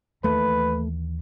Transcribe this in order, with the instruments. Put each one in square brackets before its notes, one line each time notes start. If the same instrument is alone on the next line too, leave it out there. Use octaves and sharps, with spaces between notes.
[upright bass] D#2 E3 [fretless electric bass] A3 [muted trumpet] B4